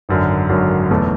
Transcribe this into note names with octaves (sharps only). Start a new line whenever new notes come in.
G#1 F#2 D3 F#3
G#1 F#2 D3 F#3
E1 E2 B2 F#3 A3